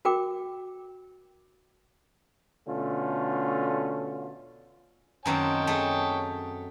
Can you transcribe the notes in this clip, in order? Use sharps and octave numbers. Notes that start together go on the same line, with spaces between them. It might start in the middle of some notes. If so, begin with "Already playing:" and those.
F#4 A#4 G5 D6
B2 D3 A3 C#4 F4
F#2 D#3 C4 C#5 G5 A5
A3 G#4